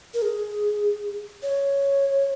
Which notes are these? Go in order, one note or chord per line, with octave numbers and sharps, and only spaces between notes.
A#4
G#4
C#5